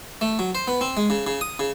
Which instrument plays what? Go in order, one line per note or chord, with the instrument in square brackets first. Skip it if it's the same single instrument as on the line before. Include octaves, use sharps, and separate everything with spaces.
[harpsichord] A3
F#3
C5
B3
C4
G#3
C#3
C#3
D#6
C#3